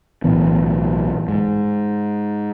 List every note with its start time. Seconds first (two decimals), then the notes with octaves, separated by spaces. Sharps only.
0.24 B1 A2 E3 B3
1.29 G#2